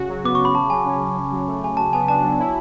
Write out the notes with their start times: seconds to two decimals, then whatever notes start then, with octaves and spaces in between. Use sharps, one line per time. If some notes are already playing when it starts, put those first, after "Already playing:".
Already playing: C#3 F#4
0.09 F#3
0.24 B3 D6
0.35 C#3 C#6
0.45 B5
0.55 C#3 A5
0.70 F#3 G#5
0.86 C#4
1.01 C#3
1.16 C#4
1.32 F#3
1.47 A3
1.62 C#3 G#5
1.77 F#3 A5
1.93 B3 G#5
2.08 D4 A5
2.23 F#3
2.39 E4